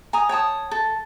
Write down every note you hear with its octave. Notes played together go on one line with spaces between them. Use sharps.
G#5 A#5 D#6
C#5 G5 A5 D#6
A4